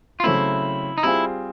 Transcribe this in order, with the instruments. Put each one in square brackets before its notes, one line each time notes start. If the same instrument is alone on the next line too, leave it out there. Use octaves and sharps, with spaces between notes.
[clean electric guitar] F4
[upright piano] C#3 F#3 A3 C4 [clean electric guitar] E4
[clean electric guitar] D#4
[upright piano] G3 C4 F4 G#4 [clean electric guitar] E4